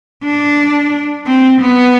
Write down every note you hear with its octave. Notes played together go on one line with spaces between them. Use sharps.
D4
C4
B3